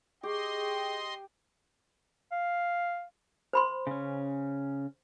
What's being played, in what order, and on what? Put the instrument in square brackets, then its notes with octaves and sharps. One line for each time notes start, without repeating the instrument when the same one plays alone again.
[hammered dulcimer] G4 [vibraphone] G#4 C#6 [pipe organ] D#5 C6 [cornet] G5
[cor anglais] F5
[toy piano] C5 B5 C6
[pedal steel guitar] C#3 C#4